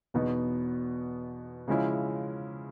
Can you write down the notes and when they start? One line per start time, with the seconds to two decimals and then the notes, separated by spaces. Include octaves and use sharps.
0.14 E2 B2 F#3 B3 D#4
1.68 C#3 F3 G#3 C#4 E4